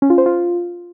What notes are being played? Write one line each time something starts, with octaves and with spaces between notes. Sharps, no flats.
C#4
F4
C5
F4